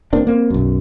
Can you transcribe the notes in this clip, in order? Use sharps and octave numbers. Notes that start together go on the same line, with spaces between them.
A1 A#3 C4 D4
A#3 C4
B1 F#2